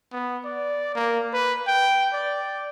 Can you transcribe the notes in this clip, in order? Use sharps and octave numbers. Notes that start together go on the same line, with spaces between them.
B3
D5
A#3
B4
G5
D5